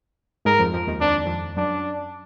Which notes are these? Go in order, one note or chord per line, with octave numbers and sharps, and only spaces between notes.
G#2 G#3 A#4
F2 F3
F2 F3
D#2 D#3
F2 D4
F2
F#2 D4